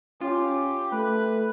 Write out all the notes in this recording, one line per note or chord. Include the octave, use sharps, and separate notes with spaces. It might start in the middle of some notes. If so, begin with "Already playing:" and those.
C#4 F4 G4
A3 B4